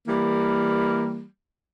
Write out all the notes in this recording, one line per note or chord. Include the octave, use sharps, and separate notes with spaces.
E3 G3 A#3